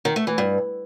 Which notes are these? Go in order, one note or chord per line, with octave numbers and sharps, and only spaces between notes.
D#3
A3
E3
G2